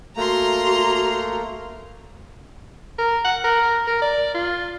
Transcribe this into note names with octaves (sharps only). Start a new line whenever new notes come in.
A3 A#3 F#4 A#5 C6
A#4
F#5
A#4
A#4
D5
F4